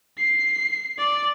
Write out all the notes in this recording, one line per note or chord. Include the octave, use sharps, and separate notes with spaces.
C7
D5